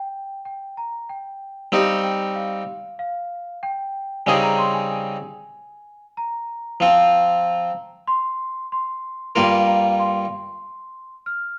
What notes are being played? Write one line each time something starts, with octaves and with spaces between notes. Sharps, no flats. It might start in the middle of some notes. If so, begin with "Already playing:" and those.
Already playing: G5
G5
A#5
G5
G3 C4 D#4 G4 F5
G5
F5
F5
G5
C#3 G3 C4 D#4 G#4 G#5
A#5
C6
G#5
G#5
A#5
F3 C4 F4
C6
C6
G2 G3 A#3 F4 A#4 C6
A#5
C6
F6